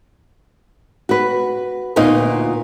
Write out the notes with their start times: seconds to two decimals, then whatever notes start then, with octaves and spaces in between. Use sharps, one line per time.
1.09 F#4 B4
1.96 D2 A#2 B3 D#4 F4 D#5